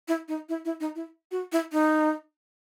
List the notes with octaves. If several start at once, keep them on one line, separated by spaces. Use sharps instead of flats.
E4
D#4
E4
E4
D#4
E4
F#4
E4
D#4